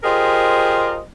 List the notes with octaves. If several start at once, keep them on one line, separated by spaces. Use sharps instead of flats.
F4 G4 G#4 A#4 C5 D#5